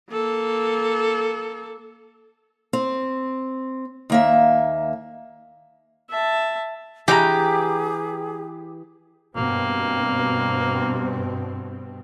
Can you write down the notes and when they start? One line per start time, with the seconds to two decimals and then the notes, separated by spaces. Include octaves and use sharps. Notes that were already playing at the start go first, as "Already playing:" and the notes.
0.11 A#3 A4
2.73 C4
4.10 D#2 A#3 E5
6.10 E5 A5
7.08 E3 G4 G#4 C#5 A#5
9.36 G2 B2 A#3 C4